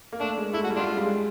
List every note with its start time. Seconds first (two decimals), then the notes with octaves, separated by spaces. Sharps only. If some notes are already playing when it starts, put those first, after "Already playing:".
0.12 A#3
0.20 A3 D4
0.38 G#3
0.54 A3 E4
0.64 F#4
0.70 G3
0.76 A3 D4 F4
0.87 G#3
0.97 G3
1.04 G#3